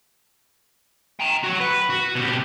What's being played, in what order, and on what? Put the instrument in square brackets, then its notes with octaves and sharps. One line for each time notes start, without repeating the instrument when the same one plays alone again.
[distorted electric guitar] G5 A#5
F#4 C#5
B4
F#4
B2 G4